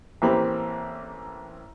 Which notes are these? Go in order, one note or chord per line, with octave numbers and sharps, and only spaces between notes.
A1 E3 A#3 C4 G4 B5